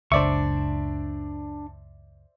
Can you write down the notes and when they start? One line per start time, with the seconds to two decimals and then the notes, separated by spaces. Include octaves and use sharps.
0.12 F#1 C#2 D4 C5 D5 E5 C#6